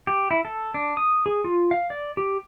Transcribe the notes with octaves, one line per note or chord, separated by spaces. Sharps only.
G4
E4
A4
D4
D#6
G#4
F4
F5
D5
G4